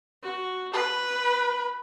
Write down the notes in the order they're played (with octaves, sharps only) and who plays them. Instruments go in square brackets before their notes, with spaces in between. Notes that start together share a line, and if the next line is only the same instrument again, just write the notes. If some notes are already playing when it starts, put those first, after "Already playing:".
[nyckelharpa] F#4
[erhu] B4 [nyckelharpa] B5